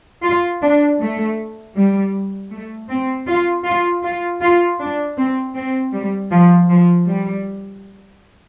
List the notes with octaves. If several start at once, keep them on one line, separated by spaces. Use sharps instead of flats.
F4
D4
A3
G3
A3
C4
F4
F4
F4
F4
D4
C4
C4
G3
F3
F3
G3